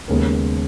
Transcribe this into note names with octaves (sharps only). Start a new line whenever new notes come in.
D#2 C#3 G#3 B3 A#4